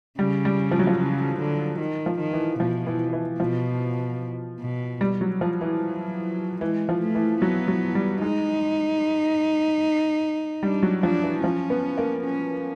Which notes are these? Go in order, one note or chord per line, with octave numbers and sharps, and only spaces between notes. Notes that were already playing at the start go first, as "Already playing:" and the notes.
C#3 G3
G3
F3
F#3
F3
C#3
D3
D#3
F3
D#3
E3
B2 F3
E3
E3
B2 F3
B2
G3
F#3
F3
E3
F#3
E3 G#3
F3
A3
E3
F#3 B3
F#3
G3
G#3 D#4
G3 D4
F#3
F3 D4
E3
F3 C#4
B3
A#3
C#4